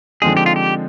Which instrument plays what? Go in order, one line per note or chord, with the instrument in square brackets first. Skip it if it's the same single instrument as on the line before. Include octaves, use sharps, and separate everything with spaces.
[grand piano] D3 F3 G#3 C4 D#4 [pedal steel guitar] G#4
[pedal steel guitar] G4
F4
G4